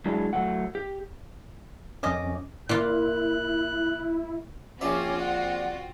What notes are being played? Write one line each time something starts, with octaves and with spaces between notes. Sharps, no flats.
F#3 G#3 D4 E4 G#4
F#3 A3 F#5
G4
F2 C#4 D#5 D6
A#2 E4 F4 F#6
A#1 C4 C#4 F4 F#4 E5 D6
D5 F#5